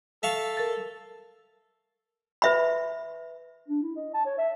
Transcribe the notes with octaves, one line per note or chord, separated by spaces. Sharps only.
A4 E5 F5 C#6
A#4 A6
B4 E5 B5
D4
E4
D#5
A5
C#5
E5